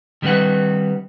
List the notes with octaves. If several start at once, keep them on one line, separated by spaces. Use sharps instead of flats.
D#3 G3 C4 D4 B4 F#5